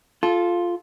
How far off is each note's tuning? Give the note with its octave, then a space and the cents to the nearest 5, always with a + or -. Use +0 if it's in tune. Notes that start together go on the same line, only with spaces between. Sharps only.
F4 +0 A4 -25